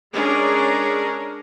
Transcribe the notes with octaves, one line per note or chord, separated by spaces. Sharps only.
G#3 C#4 D4 G#4 A#4